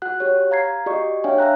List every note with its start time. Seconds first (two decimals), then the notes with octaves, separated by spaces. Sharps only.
0.02 F#4 F#5 F#6
0.20 G4 C#5
0.51 F5 A#5 G#6 C7
0.86 F#4 G4 D5 D#5 C#6
1.24 D4 C#5 E5 F5 G5 G#5
1.38 E5 F5 A#5 F#6